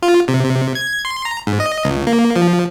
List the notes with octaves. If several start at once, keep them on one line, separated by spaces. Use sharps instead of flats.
F4
C3
C3
G#6
C6
A#5
G#2
D#5
C#2
A#3
F3